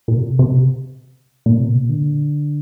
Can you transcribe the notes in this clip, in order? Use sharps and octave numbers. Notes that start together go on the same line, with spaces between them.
A#2
C3
C3
A#2
C3
A#2
D3